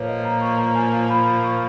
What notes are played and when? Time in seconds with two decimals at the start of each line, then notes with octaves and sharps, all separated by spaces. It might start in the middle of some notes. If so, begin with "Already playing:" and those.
Already playing: A#2 F3 A#3 B4 C#5
0.09 D#5
0.25 A#5
0.41 C#6
0.58 A#5
0.75 G#5
1.10 B5
1.26 B5
1.44 C#6